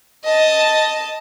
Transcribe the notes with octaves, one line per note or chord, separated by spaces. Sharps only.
D#5 A5